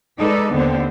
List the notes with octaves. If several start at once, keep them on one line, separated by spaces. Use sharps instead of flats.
G#3 D#4 A4 B4 D5
D#2 D3 B3 C4 C5